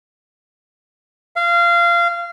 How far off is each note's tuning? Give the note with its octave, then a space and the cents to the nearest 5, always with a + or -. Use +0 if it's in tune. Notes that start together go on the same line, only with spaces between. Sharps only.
F5 -20